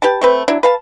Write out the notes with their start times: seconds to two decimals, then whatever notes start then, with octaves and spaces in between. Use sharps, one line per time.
0.02 G4 B4 G5 A5
0.21 A3 C4 B4
0.48 F#3 D4 E4
0.63 B4 F5 A5